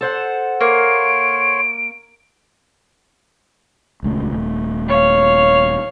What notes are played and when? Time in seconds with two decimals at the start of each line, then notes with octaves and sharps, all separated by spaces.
0.01 A4 C5 F#5
0.61 A#3 C#5 C6 D7
4.03 D#1 C#2 A3
4.32 D#1 A3
4.88 C#5 F5